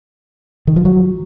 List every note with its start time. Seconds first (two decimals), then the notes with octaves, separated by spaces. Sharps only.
0.67 D#3
0.76 F3
0.85 F#3